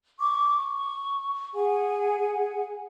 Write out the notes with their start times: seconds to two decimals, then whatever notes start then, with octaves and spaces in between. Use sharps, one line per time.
0.19 C#6 D6
0.57 C#6
1.55 G#4 F#5 G#5